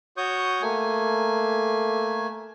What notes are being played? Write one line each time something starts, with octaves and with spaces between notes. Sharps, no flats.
F#4 C#5 C#6 D#6 G6
A3 A#3 G#5